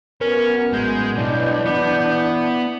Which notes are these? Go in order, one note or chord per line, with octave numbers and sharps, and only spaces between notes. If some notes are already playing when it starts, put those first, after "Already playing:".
F#2 B3 C#4 A#4 B4
A1 G#3 G6
B1 G2 D4 E4 D#5
E3 B3 E4